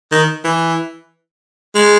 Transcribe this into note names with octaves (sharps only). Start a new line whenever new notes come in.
D#3
E3
G#3